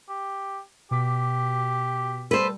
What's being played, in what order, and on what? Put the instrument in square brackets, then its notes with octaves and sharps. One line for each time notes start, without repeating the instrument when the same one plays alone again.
[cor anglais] G4
[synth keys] B2 D6 B6 [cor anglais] G4
[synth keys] G3 [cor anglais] A4 [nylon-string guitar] B4 C5